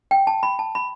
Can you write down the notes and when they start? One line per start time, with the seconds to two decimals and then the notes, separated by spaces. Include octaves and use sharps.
0.11 G5
0.27 A5
0.43 B5
0.59 A5
0.75 B5